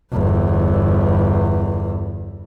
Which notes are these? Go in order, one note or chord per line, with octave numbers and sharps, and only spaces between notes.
G1 E2